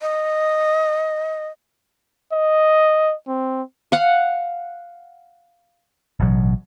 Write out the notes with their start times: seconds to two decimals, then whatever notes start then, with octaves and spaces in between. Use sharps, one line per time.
0.01 D#5
2.33 D#5
3.28 C4
3.92 F5 F#5
6.20 A1 B2 F#3